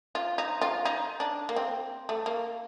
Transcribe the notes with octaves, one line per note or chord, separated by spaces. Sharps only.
F4
D#4
F4
D#4
D4
A#3
C4
A3
A#3